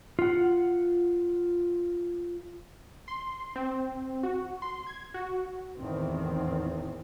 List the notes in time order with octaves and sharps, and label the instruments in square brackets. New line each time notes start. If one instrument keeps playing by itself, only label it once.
[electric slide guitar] F4 F#5
[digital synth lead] C6
C4
F#4
C6
G#6
F#4
[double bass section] E2 A2 D#3 C4